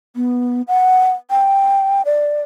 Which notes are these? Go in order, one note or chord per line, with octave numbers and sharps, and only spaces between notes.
B3
F#5
G5
D5